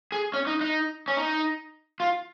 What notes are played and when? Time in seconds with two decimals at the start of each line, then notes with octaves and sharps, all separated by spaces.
0.12 G#4
0.34 C#4
0.47 D#4
0.61 D#4
1.08 C#4
1.17 D#4
2.00 F4